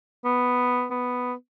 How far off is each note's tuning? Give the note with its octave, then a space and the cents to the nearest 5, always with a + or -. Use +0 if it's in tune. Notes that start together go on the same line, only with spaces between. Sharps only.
B3 +5
B3 +5